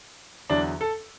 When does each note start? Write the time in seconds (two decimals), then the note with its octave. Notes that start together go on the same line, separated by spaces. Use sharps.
0.49 E2 D3 F#3 D4
0.81 A4